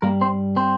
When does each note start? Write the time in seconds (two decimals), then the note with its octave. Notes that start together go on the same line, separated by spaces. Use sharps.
0.02 G2 G3 A#3 A#4
0.21 C4 C5
0.56 C4 C5